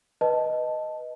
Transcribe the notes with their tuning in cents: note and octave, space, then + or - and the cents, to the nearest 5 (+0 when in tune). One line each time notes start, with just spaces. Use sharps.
B4 +0 D#5 +0 A5 +0